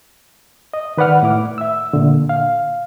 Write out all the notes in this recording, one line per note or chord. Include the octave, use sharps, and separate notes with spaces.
D#5
D#3 B4 D5 F#5 F6
A2 E4 D6
E5 E6
A#2 D3
F5